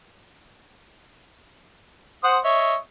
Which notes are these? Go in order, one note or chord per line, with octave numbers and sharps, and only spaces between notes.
C5 F#5 D#6
C#5 D#5 E5